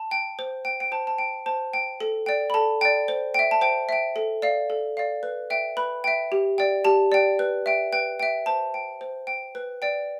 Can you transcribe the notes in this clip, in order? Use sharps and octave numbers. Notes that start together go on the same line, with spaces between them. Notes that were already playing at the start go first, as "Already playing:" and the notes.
Already playing: A5
G5
C5
G5
G5
C5 A5
A5
G5
C5 A5
G5
A4
D5 G5
B5
A4 A5
D5 G5
C5
E5 G5
A5
C5 G5
E5 G5
A4
D5 F5
A4
D5 F5
B4
E5 G5
B4 B5
E5 G5
G4
D5 G5
G4 A5
D5 G5
B4
E5 G5
B4 G5
E5 G5
C5 A5
G5
C5
G5
B4
D5 G5